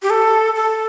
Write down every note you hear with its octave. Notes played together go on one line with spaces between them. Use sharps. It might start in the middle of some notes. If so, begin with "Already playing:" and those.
G4
A4
A4